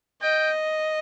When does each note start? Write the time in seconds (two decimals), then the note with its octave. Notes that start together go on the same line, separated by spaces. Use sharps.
0.22 D#5 G5